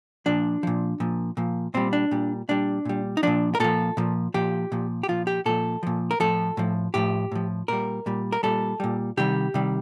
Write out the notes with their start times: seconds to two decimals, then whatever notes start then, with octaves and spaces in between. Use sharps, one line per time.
0.26 A#2 F3 D4
0.63 A#2 F3
1.00 A#2 F3
1.37 A#2 F3
1.74 A#2 G3 C4
1.93 D4
2.11 A#2 G3
2.49 A#2 G3 D4
2.85 A#2 G3
3.17 D#4
3.23 A#2 F3 D4
3.55 A#4
3.60 A#2 F3 A4
3.97 A#2 F3
4.34 A#2 F3 G4
4.72 A#2 F3
5.03 G4
5.09 A#2 F3 F4
5.27 G4
5.46 A#2 F3 A4
5.83 A#2 F3
6.11 A#4
6.20 A2 F3 A4
6.57 A2 F3
6.94 A2 F3 G4
7.32 A2 F3
7.68 A#2 G3 A#4
8.06 A#2 G3
8.32 A#4
8.43 A#2 G3 A4
8.80 A#2 G3
9.17 C3 D#3 G3 G4
9.54 C3 D#3 G3